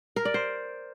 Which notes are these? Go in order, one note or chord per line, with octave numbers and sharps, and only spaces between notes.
A#4
D5
C5